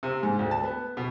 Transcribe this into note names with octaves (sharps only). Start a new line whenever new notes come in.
C3
G#2
D2
A5
B3
B2